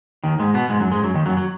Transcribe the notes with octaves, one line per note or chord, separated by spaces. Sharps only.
D#2 D#3
G#2 G#3
B2 B3
G#2 G#3
F#2 F#3
G#2 G#3
F#2 F#3
D#2 D#3
F#2 F#3
F#3